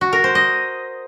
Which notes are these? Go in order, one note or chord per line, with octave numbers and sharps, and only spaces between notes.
F#4
A#4
C5
D#5